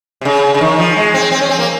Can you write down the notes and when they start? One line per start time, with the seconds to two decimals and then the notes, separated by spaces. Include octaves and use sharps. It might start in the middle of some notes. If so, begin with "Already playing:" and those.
0.21 C3
0.25 C#3
0.55 C#3
0.61 D#3
0.79 F3
0.96 G#3
1.14 C4
1.31 C4
1.41 C#4
1.49 C4
1.59 A#3